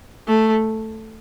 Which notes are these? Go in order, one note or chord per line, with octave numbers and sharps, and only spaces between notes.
A3